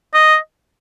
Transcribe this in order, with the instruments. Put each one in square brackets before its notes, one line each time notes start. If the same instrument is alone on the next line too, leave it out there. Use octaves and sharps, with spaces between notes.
[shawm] D#5